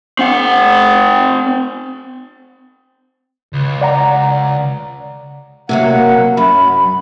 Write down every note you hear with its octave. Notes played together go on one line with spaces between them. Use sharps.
C4 F#5
C#2
D5 F#5 A#5
C3 F#3 A#3 F#5
F#2 B5